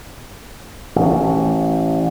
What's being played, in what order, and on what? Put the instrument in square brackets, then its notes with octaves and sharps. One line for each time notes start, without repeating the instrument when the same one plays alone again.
[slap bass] A1